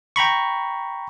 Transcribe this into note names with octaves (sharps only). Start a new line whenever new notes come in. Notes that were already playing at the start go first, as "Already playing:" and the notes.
G5 A#5 B5 C#6